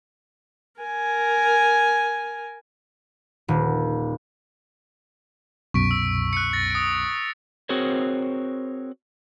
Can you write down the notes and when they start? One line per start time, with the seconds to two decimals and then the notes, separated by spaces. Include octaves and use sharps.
0.81 A#4 G#5
3.48 D#1
5.74 C2 F#2 B2 C#6 B6 D7
5.91 E6
6.33 F#6 C#7
6.53 A6 A#6
6.71 D#6 D7
7.69 C4 F#4 G#4 A#4 C5 C#5